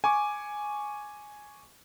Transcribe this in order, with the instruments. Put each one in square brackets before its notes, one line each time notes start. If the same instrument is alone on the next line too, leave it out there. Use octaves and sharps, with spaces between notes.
[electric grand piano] G#5 C#6 D6